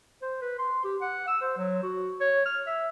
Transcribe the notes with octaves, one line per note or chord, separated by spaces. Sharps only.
C5
B4
C6
G4
F#5
E6
C5
F#3
F#4
C#5
F6
E5